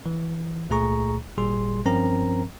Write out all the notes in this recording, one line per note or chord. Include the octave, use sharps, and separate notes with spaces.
E3
C#2 A#2 A3 G#4 A#5 C#6
G#1 A#2 G3 G#4 C6
G2 F3 C4 C#4 A#4 A#5